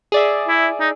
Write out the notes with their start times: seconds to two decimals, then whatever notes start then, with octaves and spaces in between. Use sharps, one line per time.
0.12 G#4 D5 E5
0.48 E4
0.80 D#4